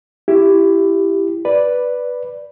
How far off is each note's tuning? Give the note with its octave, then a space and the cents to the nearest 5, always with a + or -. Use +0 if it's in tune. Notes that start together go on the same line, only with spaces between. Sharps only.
E4 +15 G4 +0
B4 +0 D5 +0